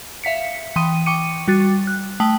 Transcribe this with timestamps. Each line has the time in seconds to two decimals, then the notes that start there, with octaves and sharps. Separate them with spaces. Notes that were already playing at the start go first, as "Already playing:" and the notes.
0.24 E5 F5 B6 C#7
0.76 E3 G5 C6 D#6 D#7
1.06 G5 C#6 D6 C#7 D#7
1.48 G3 F#4 A6
1.87 F#6
2.20 A3 G5 A5 D#6 B6 F#7